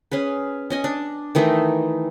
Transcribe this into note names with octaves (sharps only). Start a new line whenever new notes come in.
C#4 G#4 B4
C#4 D#5 G#5
D4
D#3 E3 A3 D#4